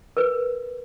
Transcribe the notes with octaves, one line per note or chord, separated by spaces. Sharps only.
A#4 B4